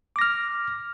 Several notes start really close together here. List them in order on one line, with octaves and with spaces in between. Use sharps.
D6 A#6 F6